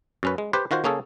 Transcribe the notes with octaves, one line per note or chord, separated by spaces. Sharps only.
F#2 C#4 B4
G#3
G4 B4 C5
D#3 F4 F#4 C5
C#3 A#3 C#4 G#4 A4